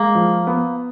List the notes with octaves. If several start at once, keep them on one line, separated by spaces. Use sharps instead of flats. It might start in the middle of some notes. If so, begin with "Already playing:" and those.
Already playing: G#3 A#3
F3
B3